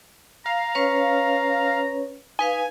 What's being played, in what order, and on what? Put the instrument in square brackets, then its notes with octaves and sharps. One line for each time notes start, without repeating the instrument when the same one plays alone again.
[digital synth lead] F5 [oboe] A#5
[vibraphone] C#4 B4 C#5
[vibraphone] D#4 B4 F5 [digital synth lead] G#5